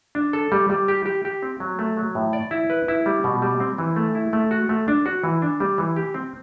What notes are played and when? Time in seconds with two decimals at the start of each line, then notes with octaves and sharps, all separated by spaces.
0.15 D4
0.33 A4
0.52 G3
0.70 G3
0.88 G4
1.06 G4
1.25 G4
1.43 C4
1.60 F#3
1.79 A3
1.97 F#3
2.15 A2
2.33 D5
2.51 E4
2.70 B4
2.88 E4
3.06 G3
3.24 B2
3.42 G3
3.60 C4
3.78 E3
3.96 A3
4.15 E4
4.33 A3
4.51 F#4
4.69 A3
4.88 D4
5.06 F#4
5.24 E3
5.42 D4
5.60 G3
5.78 E3
5.96 G4
6.14 C4